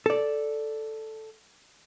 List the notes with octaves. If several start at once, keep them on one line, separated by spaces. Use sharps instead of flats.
A4 D5